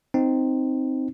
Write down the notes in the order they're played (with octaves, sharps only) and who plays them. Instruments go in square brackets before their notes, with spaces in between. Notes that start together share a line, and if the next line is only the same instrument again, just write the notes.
[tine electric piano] C4 D#4